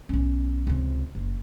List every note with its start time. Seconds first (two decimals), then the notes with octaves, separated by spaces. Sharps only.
0.09 B1 C#4
0.67 C#2 C3
1.15 F#1